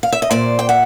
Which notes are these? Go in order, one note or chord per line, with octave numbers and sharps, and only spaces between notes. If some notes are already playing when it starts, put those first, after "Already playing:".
F5
E5
D#5
A#2 C5 D5
G5
E5 F#5